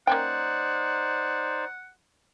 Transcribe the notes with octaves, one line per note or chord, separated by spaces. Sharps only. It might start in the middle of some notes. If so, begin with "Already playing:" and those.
A#3 C#4 D#4 C5 D5 F#5 G5